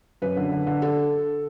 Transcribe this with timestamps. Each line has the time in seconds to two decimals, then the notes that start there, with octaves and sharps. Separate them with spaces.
0.22 F#2 B4
0.37 D3
0.52 D3
0.67 D3
0.82 A4